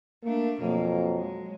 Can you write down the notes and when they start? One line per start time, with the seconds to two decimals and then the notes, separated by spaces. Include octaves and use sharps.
0.24 A3 A#3 D4
0.61 F2 B2 F#3 A#3
1.17 G#3